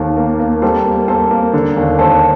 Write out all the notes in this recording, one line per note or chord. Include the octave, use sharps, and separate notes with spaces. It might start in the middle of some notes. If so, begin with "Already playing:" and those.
Already playing: D#2 D#3 A4 C5
A#3
A#3
G3 A4 C5
A#3
A#3 A4 C5
A#3
D3
D#2
D#2 A4 C5